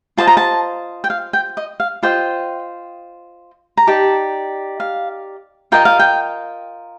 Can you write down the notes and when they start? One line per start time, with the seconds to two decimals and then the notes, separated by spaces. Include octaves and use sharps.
0.17 F4 C5 D#5 A5
0.27 A#5
0.37 A5
1.04 G5
1.10 F5
1.33 G5
1.57 D#5
1.80 F5
2.03 F4 C5 D#5 G5
3.77 A#5
3.87 D#4 G4 D5 A5
4.80 F5
5.72 F4 A#4 D#5 G5
5.85 F5
5.99 G5